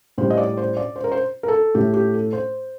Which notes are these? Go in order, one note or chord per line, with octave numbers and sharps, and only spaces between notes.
A2 G3 C5
D#5
D5
C5
D5
C5
A#4
C5
A#4
A4
A2 A3 G4
G4
A4
C5